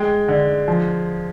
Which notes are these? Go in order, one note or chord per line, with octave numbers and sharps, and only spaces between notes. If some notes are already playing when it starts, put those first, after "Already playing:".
Already playing: G#3 G5
D3
F3